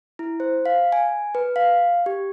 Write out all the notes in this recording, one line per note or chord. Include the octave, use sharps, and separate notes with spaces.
E4
C5
F5
G#5
B4
F5
G4